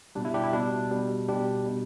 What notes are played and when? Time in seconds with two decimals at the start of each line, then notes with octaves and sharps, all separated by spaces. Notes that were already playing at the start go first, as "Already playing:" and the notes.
0.15 B2 G3 D4
0.25 E4
0.34 D4 G4
0.44 E4
0.53 B2 G3 D4
0.90 B2 G3
1.29 B2 G3 D4 G4
1.66 B2 G3